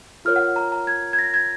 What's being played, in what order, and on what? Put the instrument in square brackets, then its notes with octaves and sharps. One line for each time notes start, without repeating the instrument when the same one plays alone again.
[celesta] F4 A#4 C#5 F6
F#5
A#5
A#5
G#6
G#6
A#6
G#6